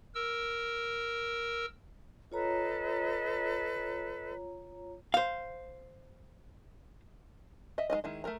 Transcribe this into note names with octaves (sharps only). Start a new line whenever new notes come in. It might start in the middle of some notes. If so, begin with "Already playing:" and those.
A#4 E6
F4 A4 B4 C#5 D#5 A#5
C5 F5
D#5 E5
G#3 C#4 D#4 D#5
D#3 G#3 E4
A3 C#4 A#4 A#5